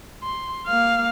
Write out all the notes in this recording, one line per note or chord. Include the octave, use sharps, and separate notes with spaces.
C6
A#3 F5